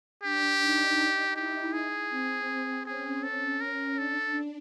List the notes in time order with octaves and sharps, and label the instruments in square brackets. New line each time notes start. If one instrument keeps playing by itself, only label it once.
[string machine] D4 [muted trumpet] G4
[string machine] D#4
[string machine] E4 [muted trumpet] G4
[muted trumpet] G#4
[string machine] C4
[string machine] C#4 [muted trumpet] G#4
[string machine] C#4 [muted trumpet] A4
[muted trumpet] A#4
[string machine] D4 [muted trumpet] A4